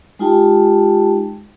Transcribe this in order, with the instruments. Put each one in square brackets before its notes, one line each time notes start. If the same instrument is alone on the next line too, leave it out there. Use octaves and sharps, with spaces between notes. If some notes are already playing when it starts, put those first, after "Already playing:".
[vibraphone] G#3 D#4 F4 G4 G5 A5